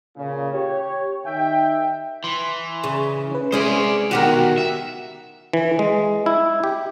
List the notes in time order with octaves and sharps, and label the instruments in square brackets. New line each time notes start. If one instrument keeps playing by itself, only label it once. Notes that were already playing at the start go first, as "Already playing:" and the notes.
[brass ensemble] A#2 C#3
G4 C#5
D#3 E5 G5
[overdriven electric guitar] E3 [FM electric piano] C6
[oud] C#3
[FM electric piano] C#4 B4
[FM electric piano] C3 G#3 D#6 [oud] C#4 E4 G#4 [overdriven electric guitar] C5 D5
[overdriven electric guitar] B2 D#3 [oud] F#4 G4 A#4
[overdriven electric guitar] E5
[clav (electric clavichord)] E3
G#3
E4
G4